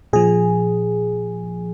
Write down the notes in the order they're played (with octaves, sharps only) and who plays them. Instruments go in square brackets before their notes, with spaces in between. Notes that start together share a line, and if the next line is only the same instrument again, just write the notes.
[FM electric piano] A#2 F3 G#4